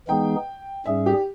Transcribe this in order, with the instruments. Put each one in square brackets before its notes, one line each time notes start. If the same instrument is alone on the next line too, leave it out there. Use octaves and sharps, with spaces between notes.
[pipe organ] E3 G#3 B3 D#4 G#4 [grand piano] G5
[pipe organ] G#2 G3 C#4 G#4 [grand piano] E5
[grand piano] G4